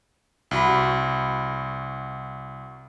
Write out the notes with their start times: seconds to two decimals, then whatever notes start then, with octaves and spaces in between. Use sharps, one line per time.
0.51 C2 F#4 B5